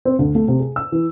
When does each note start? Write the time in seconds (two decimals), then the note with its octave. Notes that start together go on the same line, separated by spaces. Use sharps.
0.05 C4
0.19 D2
0.35 A3
0.48 C3
0.59 G#4
0.76 E6
0.92 E3